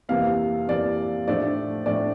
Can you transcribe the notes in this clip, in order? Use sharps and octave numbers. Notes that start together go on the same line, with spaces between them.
F2 C3 E3 A#3 F5
F2 C3 E3 A#3 D5
A2 F3 A3 D4 D5
A2 F3 A3 D4 D5